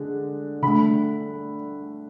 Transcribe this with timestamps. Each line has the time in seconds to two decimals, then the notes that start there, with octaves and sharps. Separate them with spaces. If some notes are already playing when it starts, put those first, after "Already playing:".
Already playing: D3 G#3
0.62 D3 A3 B5